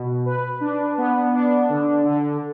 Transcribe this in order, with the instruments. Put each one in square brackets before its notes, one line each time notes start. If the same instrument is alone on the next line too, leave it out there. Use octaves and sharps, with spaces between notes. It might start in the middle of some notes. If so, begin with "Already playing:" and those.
Already playing: [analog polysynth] B2
B4
D4
B3
D4
D3
D3